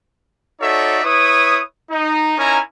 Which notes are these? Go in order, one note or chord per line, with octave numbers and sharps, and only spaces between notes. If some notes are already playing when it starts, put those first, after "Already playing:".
D#4 F#4 A4 C#5 D5 E5
E4 B4 C#5 D#6
D#4
C#4 D#4 E4 A#4 G#5 A#5